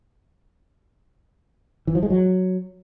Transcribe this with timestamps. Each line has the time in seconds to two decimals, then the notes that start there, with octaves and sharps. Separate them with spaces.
1.87 E3
1.95 F3
2.03 G#3
2.10 F#3